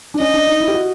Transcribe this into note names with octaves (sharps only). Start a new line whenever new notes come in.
D4
C#4 D#5
D4
D#4
E4
G4
F#4